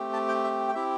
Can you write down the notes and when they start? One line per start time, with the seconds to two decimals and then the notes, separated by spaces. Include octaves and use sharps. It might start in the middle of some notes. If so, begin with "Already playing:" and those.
Already playing: A3 C4 G4
0.13 A5
0.28 G5
0.44 E5
0.68 G5
0.74 C4 E4 G4 E5